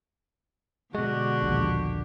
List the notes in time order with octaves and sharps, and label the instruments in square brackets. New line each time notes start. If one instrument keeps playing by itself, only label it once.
[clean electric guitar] B2 G#3 [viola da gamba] D3 D4 G4 [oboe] F#4
[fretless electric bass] A#1 D#2